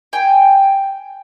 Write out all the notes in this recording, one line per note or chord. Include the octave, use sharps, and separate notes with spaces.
G5 G#5